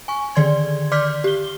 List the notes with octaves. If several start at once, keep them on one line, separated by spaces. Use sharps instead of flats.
G#5 C#6
D3 D#3 D5 C6 G#6
D5 C6 D6 F6 G6 B6
G4 G7